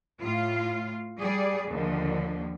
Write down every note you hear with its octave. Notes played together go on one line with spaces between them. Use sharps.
A2 F4 F5
G3 G#4 D5
D#2 D3 F3